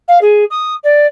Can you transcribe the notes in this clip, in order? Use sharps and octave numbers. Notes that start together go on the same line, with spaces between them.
F5
G#4
D#6
D5